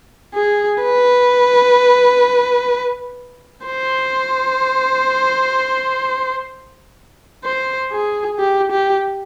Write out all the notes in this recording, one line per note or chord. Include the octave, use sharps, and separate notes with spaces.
G#4
B4
C5
C5
G#4
G4
G4